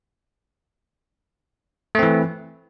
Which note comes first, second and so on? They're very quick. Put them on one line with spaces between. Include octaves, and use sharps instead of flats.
A3 C4 E3